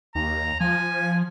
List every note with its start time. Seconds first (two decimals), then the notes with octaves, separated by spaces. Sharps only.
0.15 D#2 A#5
0.60 F3 G#5